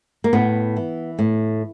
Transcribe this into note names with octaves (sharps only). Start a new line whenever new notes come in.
A#3
A2 B3
E3
A2